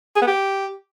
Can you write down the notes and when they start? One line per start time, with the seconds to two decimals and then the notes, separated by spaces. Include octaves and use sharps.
0.16 G#4
0.22 B3
0.27 G4